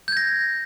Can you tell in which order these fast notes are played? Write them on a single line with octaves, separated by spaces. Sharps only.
G6 G#6 A#6